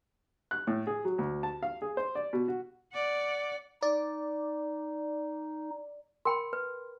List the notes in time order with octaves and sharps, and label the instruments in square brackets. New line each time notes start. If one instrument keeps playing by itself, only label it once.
[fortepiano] F#6
A2
G#4
F#3
D2
A5
F5
G#4
C5
D5
B2
F#4
[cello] D5 F#5
[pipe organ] D#4 [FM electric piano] D5
[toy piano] A#4 G5 B5 [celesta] C6
[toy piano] B4